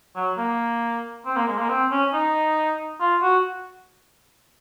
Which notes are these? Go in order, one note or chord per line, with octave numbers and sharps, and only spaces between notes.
F#3
A#3
C4
A#3
G#3
A#3
C4
C#4
D#4
F4
F#4